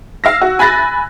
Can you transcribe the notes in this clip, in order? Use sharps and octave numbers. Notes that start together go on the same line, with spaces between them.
F5 E6 A#6
F#4
G#5 B5 F#6 A6 A#6